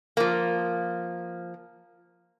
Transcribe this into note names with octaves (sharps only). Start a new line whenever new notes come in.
F3 A#3